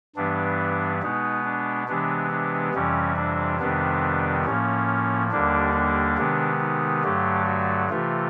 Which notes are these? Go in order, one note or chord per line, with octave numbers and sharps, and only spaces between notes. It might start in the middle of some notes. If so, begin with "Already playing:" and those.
G2 E3 G3 B3 D4
B2 G#3 B3 D#4
D4
C3 E3 G#3 B3 D4
D4
F2 C3 E3 G3 C#4
D4
F2 C3 D#3 G3 B3 D4
A2 F3 A#3 C#4
D#2 D3 G3 A#3 D4
D4
C3 D#3 G#3 B3
D#4
G2 D3 F#3 A3 G4
F#4
C3 E3 A3 F4